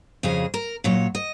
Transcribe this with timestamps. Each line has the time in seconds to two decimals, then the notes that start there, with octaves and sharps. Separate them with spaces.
0.23 F2 C#3 F#3 G#4
0.54 A#4
0.84 A#2 F#3 C#5
1.15 D#5